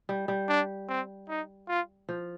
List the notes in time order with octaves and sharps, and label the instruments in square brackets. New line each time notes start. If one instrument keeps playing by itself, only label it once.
[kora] G3
G3
[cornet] D4
C4
D#4
F4
[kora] F3